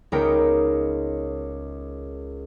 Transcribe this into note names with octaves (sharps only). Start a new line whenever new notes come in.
C#2 B3 D#4 A#4 G5 C#7